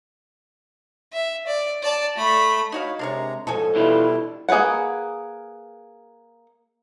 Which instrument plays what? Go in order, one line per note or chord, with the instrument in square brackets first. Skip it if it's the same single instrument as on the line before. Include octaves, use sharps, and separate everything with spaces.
[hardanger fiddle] E5
D5
D5 A5
A3 B5
[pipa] D#4 F#4 F5 [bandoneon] C#5 B5
[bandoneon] C3 G#3 A#5 [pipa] D4 A#4 C#5
[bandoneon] G#2 F3 [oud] A4 [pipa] C#5 D#5 G#5
[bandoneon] B2 G3 E4 [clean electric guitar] E3 D4 F4
[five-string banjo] A#3 G#4 A#4 B4 F#5